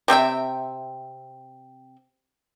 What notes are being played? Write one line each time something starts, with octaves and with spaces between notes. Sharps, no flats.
C3 C4 E5 G5